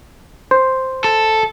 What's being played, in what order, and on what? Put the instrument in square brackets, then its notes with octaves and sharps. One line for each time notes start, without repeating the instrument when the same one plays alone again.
[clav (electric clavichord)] C5
[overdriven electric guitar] A4